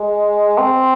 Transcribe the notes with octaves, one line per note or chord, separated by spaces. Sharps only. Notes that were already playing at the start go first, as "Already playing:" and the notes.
Already playing: G#3
C4